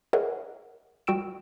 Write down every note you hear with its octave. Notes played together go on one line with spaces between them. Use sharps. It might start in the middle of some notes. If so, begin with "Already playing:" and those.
G#4 A#4 C#5 D#5 E5 F#5
G3 F#4 G5 E6 D7 E7